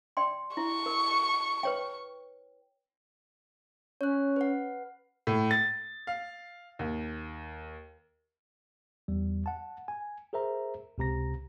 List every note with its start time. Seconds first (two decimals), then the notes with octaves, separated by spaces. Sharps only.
0.17 D5 G5 C6
0.57 E4 C#6
0.86 A#4
1.63 B4 C#5 G5
4.01 C#4 C#5 F#6
4.36 B4 F#5
5.27 A2
5.51 A6
6.07 F5
6.79 D#2
9.08 E2 G3
9.46 F#5 A5
9.88 G#5
10.33 G#4 A#4 C5 E5 A#5
10.98 C#2 C3 A#5 A#6